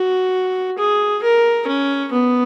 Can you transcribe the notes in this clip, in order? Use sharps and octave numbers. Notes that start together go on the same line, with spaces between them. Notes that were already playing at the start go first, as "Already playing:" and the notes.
Already playing: F#4
G#4
A#4
C#4
B3